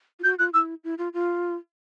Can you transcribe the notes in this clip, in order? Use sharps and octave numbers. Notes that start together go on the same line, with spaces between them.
F4
F#4 G6
F4 F#6
E4 E6
E4
F4
F4